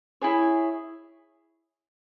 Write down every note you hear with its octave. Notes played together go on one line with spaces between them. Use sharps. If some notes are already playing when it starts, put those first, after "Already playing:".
E4 G#4 C#5